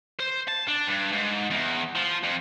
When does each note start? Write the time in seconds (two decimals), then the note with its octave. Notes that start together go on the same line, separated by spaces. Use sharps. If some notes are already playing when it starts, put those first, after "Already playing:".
0.20 C5
0.48 A5
0.68 D4
0.88 G2
1.13 G#2
1.50 E2
1.96 F3
2.24 F2